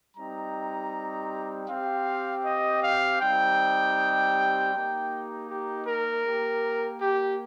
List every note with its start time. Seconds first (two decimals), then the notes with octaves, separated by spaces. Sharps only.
0.17 G3 C4 D#4 G4 A#5
1.69 C4 G4 F5
2.45 D#5
2.83 F5
3.21 G3 C4 D#4 G4 G5
4.72 A#3 D#4 G4
5.49 G4
5.87 A#4
6.25 A#3 G4
7.01 G4